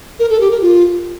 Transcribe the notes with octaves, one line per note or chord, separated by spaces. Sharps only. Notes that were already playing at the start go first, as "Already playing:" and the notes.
A#4
A4
G4
A#4
F4